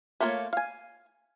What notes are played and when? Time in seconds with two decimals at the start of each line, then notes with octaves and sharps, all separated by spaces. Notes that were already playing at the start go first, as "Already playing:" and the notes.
0.20 A3 A#3 F4 A4 C#5
0.53 F5 G#5